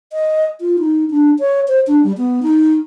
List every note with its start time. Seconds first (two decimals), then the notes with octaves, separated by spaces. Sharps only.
0.13 D#5
0.61 F4
0.79 D#4
1.11 D4
1.39 C#5
1.68 C5
1.87 D4
2.04 G3
2.18 B3
2.43 D#4